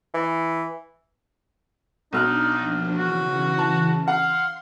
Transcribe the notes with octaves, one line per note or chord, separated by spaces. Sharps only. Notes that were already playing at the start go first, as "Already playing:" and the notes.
E3
B1 D4 D#4 D5 F6 F#6
F3 A#3 D4
C#3 E3 F#4
A5
F5 F#5 C6